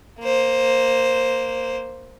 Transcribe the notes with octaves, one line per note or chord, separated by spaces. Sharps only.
A#3 C5